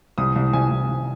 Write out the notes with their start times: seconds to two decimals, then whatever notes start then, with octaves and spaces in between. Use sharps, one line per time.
0.18 C2 D#6
0.36 C2
0.53 C2 G#5
0.71 C2
0.89 C2